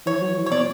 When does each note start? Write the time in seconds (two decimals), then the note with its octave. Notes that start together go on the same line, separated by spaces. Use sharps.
0.06 E3 C#5
0.22 F#3
0.37 E3
0.46 C#5
0.51 B2 D5